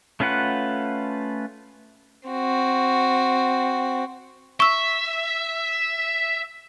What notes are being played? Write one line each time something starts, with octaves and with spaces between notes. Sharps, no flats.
A3 C#4 F4 B4 F#5
C4 F#4
E5 C#6 E6